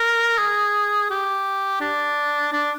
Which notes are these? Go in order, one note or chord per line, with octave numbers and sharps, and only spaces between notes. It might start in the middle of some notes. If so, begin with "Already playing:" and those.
Already playing: A#4
G#4
G4
D4
D4